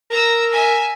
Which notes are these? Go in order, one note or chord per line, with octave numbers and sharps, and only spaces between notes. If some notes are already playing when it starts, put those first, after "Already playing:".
A#4 A#5 E6
E5 G#5